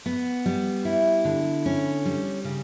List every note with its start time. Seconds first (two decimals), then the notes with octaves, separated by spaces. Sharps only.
0.06 B3
0.46 G3
0.85 E4
1.25 D3
1.66 C#4
2.05 G3
2.45 C#3